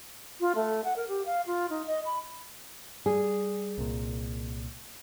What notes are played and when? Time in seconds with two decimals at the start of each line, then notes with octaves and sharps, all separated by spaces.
0.40 F4
0.55 A3
0.84 F#5
0.96 A#4
1.08 G4
1.25 F5
1.46 F4
1.69 D#4
1.87 D#5
2.05 B5
3.06 G3 G#4
3.78 C2 A#2